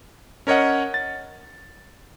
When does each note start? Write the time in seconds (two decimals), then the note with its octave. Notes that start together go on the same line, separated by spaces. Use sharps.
0.47 C#4 A#4 C#5 D#5 F#5
0.94 A6